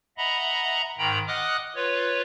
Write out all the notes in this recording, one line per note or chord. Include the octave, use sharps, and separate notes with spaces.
D#5 E5 F#5 A#5 B5
G#2 D#3 G5 A#5 B5
D#5 F#5 D6 D#6 F6 F#6
F4 B4 C#5